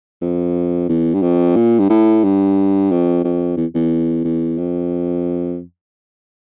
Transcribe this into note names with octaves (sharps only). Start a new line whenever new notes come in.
F2
E2
G2
F2
A#2
G2
A2
G2
F2
F2
E2
E2
E2
F2